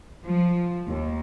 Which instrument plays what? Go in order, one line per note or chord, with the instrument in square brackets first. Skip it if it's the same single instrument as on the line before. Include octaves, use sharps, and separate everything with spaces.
[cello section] F3
D#2